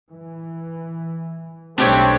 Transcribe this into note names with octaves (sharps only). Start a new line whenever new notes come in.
E3
B1 B2 A3 C4 D4 G4 C#5